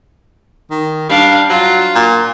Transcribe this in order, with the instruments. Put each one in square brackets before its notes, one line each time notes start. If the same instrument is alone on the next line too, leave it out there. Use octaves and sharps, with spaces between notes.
[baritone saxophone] D#3
[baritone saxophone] G3 [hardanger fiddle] D4 F5
[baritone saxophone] F#3 [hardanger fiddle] F4
[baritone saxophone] A#2